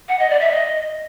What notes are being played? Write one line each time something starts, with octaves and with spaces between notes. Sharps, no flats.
F#5
D#5
D5
E5
D#5